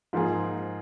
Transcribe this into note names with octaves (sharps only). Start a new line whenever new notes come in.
G#2 F3 A#3 F4 G#4